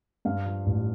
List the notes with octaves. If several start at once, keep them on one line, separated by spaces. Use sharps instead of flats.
G2 F5
F3
A1